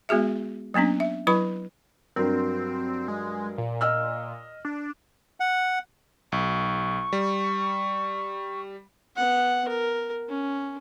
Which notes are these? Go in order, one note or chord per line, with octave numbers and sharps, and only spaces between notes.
G#3 B3 F#4 G#4 E5
F#3 A#3 B3 C#4 D4
E5
F#3 E4 B4 B5
G2 F#3 C4 A#4
G#3
A#2
D#5 E6 F6
D4
F#5
B1 C#6
G3
B3 F#5
A#4
C#4